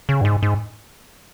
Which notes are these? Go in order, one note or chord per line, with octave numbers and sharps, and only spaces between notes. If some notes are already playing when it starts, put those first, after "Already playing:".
C#3
G2
G#2
G#2